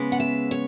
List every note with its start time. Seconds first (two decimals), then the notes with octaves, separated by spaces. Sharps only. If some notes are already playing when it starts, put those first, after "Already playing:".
Already playing: C#3 G#3 B3
0.12 F#5
0.20 E5
0.51 C#5